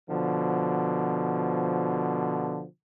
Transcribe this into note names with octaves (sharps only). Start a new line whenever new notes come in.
B2 D3 F3